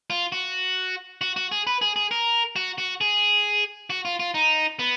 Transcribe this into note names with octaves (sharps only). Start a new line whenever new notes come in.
F4
F#4
F#4
F#4
G#4
B4
G#4
G#4
A#4
F#4
F#4
G#4
F#4
F4
F4
D#4
B3